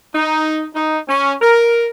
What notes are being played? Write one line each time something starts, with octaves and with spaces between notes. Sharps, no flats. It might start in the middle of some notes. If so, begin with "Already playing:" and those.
D#4
D#4
C#4
A#4